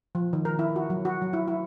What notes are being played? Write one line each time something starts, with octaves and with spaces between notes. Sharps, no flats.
F3
D#3
A#4
E4
F#4
F#3
F#4
F#3
E4
E4